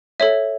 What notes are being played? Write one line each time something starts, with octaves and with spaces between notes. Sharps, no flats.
A4 C#5 E5